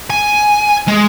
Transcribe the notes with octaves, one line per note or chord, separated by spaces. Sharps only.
G#5
G#3